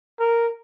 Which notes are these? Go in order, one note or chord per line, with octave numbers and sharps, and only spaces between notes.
A#4